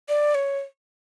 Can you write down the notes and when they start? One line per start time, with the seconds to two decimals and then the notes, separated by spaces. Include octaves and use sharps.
0.09 D5
0.35 C#5